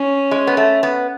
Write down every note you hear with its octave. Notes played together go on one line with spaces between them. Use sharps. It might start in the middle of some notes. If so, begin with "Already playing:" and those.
Already playing: C#4
G#3
B3
A3
B3